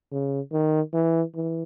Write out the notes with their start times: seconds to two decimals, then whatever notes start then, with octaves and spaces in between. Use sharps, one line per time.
0.12 C#3
0.52 D#3
0.93 E3
1.35 E3